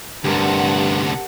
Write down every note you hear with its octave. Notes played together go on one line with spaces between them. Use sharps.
D2 G2 C3 G4 A#4 F#5 A5